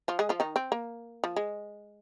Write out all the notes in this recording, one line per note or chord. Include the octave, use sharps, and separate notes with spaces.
F3 F4
G#3 G#4
F3 F4
D#3 D#4
C4
A#3
F3
G#3